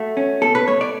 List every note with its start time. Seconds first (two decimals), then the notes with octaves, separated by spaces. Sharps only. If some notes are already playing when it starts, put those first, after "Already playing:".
Already playing: A3 F#4
0.17 C#4
0.42 B2 A4
0.55 B4
0.68 A3 C#5
0.81 D5